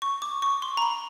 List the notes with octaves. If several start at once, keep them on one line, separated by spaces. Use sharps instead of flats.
C#6
D6
C#6
C6
A#5
B5